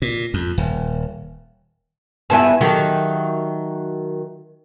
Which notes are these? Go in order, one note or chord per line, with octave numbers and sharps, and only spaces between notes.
A#2
F2
D#1
G2 B3 E4 G#5 A5
D#3 F#3 G4 A4 E5